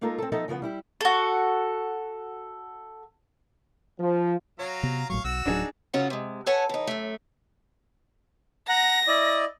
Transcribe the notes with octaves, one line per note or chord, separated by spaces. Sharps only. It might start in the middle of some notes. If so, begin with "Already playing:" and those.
G#3 A#3 D#4 F4 A4 A#4
C4 A4
F3 B3 D#4 A4 D#5 E5
C#3 F3 B3 B4 F#5
G3 E4 G4
F#4 A4
F3
F#3 C#5 F5 A#5
C3 B3
A#1 A2 F#3 F5 C#6
B1 F#4 E6
D1 F#3 D4 D#4 G#4
E2 C#3 F#3 C#4 F4 F#5
C3 G#3
A4 B4 C#5 F#5 G#5 A5
E3 D#4
F#2 A3
F#5 A#5 A#6
E4 D5 D#5